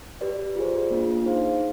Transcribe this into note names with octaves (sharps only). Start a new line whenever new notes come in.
G4 B4 D5
F4 G#4 C5
A#3 D4 F4
D#4 G#4 C5 F5